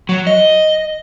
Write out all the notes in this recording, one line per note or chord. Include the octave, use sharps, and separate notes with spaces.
F#3
D#5